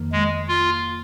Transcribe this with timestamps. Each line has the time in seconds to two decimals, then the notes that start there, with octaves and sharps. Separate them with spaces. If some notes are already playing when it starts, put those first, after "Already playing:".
Already playing: F2 D#3 A#3
0.12 G#3
0.48 F4